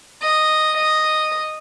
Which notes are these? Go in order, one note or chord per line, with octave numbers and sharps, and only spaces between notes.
D#5
D#5